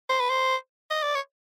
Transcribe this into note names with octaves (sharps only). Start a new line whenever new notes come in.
C5
B4
C5
D#5
D5
C#5